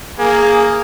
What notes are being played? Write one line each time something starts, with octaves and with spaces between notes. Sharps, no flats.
A#3 G#4 G#5 G#6